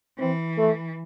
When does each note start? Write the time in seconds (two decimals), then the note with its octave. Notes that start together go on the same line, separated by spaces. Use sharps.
0.18 E3 C4
0.58 A3